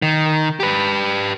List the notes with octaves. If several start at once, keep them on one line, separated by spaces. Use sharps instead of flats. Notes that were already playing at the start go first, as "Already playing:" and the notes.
D#3
G4 B4